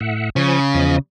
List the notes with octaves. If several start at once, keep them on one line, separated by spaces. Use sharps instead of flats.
A2 E5 F#5
C#3 F3 G#5 C#6
E2 F3 D#5